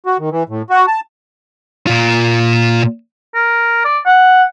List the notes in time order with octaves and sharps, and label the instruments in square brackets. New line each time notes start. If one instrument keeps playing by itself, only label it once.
[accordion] F#4
D#3
E3
A2
F#4
A5
[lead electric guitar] A#2 F4
[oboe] A#4
D5
F#5